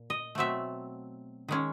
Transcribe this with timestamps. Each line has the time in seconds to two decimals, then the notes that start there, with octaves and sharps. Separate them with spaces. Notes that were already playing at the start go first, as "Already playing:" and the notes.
Already playing: A#2
0.10 D#5
0.35 B2 F#3 A3 C4 E5
1.48 D#3 G#3 C#4